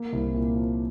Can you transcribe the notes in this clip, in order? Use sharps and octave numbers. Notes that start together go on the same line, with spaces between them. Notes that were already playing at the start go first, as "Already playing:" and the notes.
Already playing: A#3
C2
A#2
F3